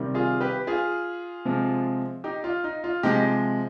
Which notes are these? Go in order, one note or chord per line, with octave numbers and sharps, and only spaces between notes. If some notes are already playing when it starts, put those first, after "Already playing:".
Already playing: C3 D#3 G3
F4 G#4
G4 B4
F4 G#4
C3 F3 G#3
D#4 G4
F4
D#4
F4
C3 F3 G#3 D#4 G4